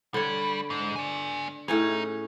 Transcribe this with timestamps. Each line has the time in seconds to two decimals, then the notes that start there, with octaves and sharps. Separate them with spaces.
0.14 D3 G3 C#5
0.70 G#2
0.96 D5 G#5
1.68 A2 C#4 D#4 G#4